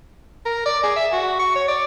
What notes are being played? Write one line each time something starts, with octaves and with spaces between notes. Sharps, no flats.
A#4
D5
G#4
E5
F#4
C#6
C#5
D5